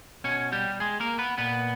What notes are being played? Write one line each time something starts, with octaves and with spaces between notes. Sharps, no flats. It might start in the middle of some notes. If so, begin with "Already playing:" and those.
B2 C#4 C#5
G3 G4
G#3 G#4
A#3 A#4
B3 B4
A#2 B3 B4